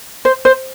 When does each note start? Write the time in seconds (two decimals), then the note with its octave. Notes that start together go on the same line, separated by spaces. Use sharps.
0.25 C5
0.45 C5